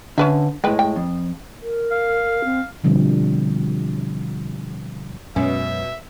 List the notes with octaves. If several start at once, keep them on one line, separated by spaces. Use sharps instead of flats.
D3 C#4 B4 E5
A2 G#3 B4 G5
G5
F2
A#4
F5
C4
B2 D3 F3 G3 C4
F#2 B2 G#3 C#4 E5